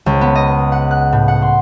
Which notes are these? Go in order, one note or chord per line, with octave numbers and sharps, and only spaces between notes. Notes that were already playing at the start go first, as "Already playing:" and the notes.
C#2
B3
D#5
F#5
F#6
A2
F#5
C6